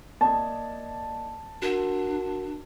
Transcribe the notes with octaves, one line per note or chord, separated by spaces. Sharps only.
A#3 D5 D#5 A5
D4 F#4 A#4 F#5